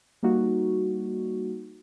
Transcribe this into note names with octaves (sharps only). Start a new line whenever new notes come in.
G3 A#3 D#4 F#4